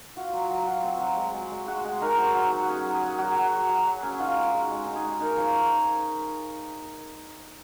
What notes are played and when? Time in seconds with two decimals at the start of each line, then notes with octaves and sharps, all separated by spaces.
0.17 F4 F#4
0.33 F#3
0.50 F#3
0.67 F4 F#4
0.83 C4
1.00 F#3
1.17 G#3
1.34 G#3
1.51 G#3
1.67 G#3 F#4
1.84 G#3 G#4
2.02 D#4 A#4
2.18 F#3 C5
2.35 F#3
2.52 F#3
2.62 F#4
2.68 C#4 G#4
2.86 F#3
2.94 G#4
3.02 F#3
3.18 F#3 F#4
3.36 F#3
3.53 F#3
3.69 F#3
3.87 F#3
4.03 C#4
4.20 D#4 F4
4.37 G#3
4.45 F#4
4.54 G#3
4.71 G#3
4.86 D#4
4.96 G#4
5.04 G#3
5.20 D#4 A#4
5.38 F3 C#5